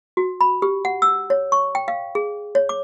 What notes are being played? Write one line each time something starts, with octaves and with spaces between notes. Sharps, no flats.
F#4
B5
G4
F#5
E6
C#5
C#6
G5
F5
G#4
C#5
D6